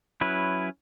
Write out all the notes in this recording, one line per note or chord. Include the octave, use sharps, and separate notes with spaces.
F#3 C#4 E4 B4